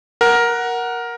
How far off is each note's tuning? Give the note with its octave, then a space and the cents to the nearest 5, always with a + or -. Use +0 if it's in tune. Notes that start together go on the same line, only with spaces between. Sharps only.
A#4 +10 F#5 +0